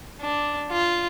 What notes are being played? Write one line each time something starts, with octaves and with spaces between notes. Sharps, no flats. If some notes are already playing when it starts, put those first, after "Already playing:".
D4
F4